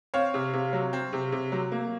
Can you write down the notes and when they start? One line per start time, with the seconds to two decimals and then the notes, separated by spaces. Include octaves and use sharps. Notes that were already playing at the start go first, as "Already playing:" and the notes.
0.14 C4 C#5 F5
0.34 C3
0.53 C3
0.73 F#3
0.93 C4
1.13 C3
1.32 C3
1.52 F#3
1.72 A#3